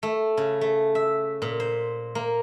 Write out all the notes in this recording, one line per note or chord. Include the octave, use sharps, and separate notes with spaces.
A3
C#3
A3
E5
A#2
C5
A#3